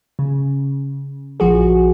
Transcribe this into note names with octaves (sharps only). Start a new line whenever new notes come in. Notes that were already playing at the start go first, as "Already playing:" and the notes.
C#3
A#1 F3 F#4 G#4